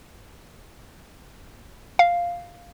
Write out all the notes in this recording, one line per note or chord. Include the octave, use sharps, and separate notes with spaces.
F5